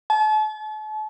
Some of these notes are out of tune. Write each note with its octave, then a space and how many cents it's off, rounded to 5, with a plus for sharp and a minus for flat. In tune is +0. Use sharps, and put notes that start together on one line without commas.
A5 -40